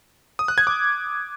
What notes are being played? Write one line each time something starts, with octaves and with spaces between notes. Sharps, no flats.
D#6
F#6
G#6
D6